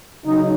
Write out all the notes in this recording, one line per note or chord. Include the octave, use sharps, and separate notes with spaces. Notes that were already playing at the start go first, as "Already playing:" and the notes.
C#3 F#3 D#4